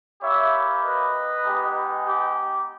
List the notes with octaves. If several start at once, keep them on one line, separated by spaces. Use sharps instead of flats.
A#3 E4 G4 C#5 E5
B4 D#5
G#3 B3 D#4 G4
G4